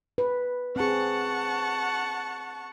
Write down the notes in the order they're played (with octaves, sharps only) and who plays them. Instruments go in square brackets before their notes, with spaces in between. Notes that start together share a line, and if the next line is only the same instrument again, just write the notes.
[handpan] B4
[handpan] C4 G#4 [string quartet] F#5 A5 C#6